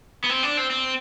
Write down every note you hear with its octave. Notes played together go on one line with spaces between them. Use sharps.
B3
C4
D4
C4
C4